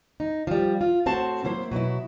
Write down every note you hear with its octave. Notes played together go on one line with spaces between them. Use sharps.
D#4
F3 G3
F4
A2 C4 F#4 C5 A5
F#3 A#3 E4 C5
B2 F#3 B3 E4